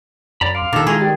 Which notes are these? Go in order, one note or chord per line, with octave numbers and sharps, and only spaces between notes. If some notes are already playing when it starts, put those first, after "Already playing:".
F#2 D5 A#5 B5
F5 C6 D6 D7
A#2 D#3 A4 D6 A6 F7
G#3 E4 F4 G#4 A#4 C#6 F7
G4 D5 G5